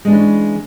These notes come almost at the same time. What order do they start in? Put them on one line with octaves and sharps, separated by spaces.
G#3 D4 E3 C#4